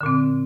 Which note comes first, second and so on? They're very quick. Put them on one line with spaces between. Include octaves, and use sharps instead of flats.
D3 A#2 C4